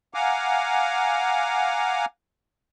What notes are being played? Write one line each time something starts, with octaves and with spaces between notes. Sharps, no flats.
F5 F#5 G#5 A#5 D6